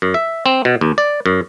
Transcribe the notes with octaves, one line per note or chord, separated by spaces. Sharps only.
F#2
E5
C4
B2
D#2
D5
F#2